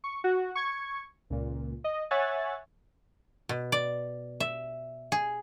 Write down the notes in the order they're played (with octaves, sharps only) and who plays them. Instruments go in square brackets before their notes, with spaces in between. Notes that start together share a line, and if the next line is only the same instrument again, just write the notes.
[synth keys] C#6
F#4
C#6 G#6
C#2 A#2
D#5
C#5 E5 F#5 G#5 F#6 A6
[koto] B2
D5
E5
G#4